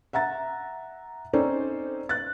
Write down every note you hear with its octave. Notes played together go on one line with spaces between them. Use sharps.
E5 F#5 A#5 A6
C4 C#4 D#4 A4 C5 D5
F#6 A6